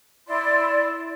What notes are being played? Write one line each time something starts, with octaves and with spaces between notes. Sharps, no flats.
E4 D5 C6